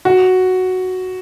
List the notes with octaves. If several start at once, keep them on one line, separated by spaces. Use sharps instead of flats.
F#4